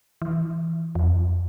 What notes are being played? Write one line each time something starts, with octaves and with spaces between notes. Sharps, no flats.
E3
F2